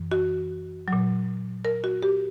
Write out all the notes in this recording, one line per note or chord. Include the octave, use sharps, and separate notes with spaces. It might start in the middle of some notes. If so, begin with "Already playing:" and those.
Already playing: F#2 E3
F#4
A#2 F#3
A#4
F#4
G4